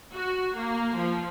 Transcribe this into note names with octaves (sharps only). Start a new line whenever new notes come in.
F#4
A#3
F3